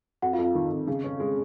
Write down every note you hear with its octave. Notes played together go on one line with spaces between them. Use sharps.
F2 F#4 F#5
F4 F5
F2
F4 F5
D#3
F2
C#3
C#4
G#3